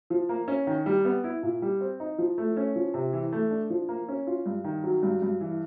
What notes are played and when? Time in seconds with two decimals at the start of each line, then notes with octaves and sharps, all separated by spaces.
0.10 F3
0.29 A#3
0.48 C#4
0.67 D#3
0.86 G3
1.05 B3
1.24 E4
1.43 A#2
1.62 G3
1.81 C4
2.00 D#4
2.18 F3
2.38 A3
2.57 C#4
2.76 F3
2.94 C3
3.13 E3
3.33 A3
3.51 D4
3.70 F3
3.89 A#3
4.08 C#4
4.27 F4
4.46 G2
4.64 D#3
4.84 F#3
5.03 G2
5.22 G2
5.41 E3